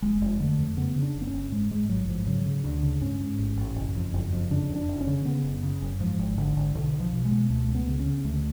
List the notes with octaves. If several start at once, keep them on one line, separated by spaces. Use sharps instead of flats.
F1 G#3
F1
D3 A3
F2
C#3 B3
C#3
D4
F#1
B3
C#4
F#1
G#2 G#3
G#2 G#3
A1 F#3
G#2 F3
C#3 F#3
C#3
D2 D4
C#3
G#2 C#4
G#2
A1
A1
F#1
F2
F#1
F2
C#3 D4
F2
D4
F1
C#4
C#3
C#3 B3
F#1
C#3
F#1
G#2 F3
G#1
G#1 D3
G#1
B1 D3
B2
F3
B2
G#3
B2
C#2 A3
C#2
B3
C#3
C#4
C#3
D2 A3